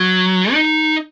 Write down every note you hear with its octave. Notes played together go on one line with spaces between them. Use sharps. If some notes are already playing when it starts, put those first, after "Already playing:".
Already playing: F#3
D#4